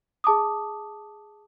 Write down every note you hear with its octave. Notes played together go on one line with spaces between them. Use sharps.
G#4 A5 D6 D#6